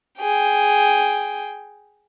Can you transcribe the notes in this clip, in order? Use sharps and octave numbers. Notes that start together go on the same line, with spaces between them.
G#4 G5